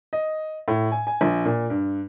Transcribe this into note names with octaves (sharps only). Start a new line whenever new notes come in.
D#5
A2
G#5
G#5
A#1
A#2
G2